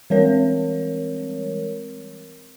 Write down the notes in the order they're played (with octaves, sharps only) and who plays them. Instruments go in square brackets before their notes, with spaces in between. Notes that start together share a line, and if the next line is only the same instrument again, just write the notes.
[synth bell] E3 G3 G#3 C4 A#4 C#5